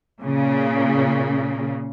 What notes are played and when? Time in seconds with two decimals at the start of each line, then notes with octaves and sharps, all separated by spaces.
0.22 A#2 C#3